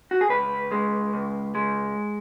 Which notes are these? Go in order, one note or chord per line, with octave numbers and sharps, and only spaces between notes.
F#4
G#4
C#2 B4
G#3
C#2
G#3